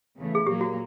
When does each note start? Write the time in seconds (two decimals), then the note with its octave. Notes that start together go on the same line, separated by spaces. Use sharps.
0.18 E2 C#3 E3 A3
0.35 G#4
0.45 A#2 F#3 A#3 G4
0.61 F#4